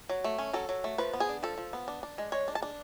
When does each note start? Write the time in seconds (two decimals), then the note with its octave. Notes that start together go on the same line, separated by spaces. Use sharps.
0.09 F#3
0.24 A3
0.38 C#4
0.53 F#3 A4
0.69 F#3
0.84 A3
0.98 F3 B4
1.13 B3
1.20 G#4
1.29 D4
1.43 F3 A4
1.58 F3
1.73 B3
1.88 D4
2.03 D4
2.18 G#3
2.32 G#3 C#5
2.48 D4
2.55 A5
2.62 D4